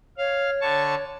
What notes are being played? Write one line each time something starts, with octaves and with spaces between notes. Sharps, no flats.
C#5 F5
D3 A5 C#6